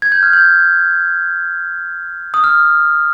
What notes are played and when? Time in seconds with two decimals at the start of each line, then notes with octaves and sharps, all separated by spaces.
0.02 G#6
0.12 G6
0.23 F6
0.33 G6
2.34 D#6
2.44 F6